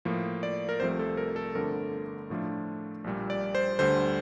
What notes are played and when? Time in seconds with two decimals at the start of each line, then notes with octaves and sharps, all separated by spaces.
0.05 A2 F3 A#3
0.43 D5
0.69 A#4
0.80 C2 C3 F3 A3 C5
0.99 A4
1.17 A#4
1.36 A4
1.55 G1 F2 D3 A3 A#4
2.30 A2 F3 A3 D4 F4
3.04 A#1 A#2 G3
3.30 D5
3.55 C5
3.79 D2 D3 G3 C5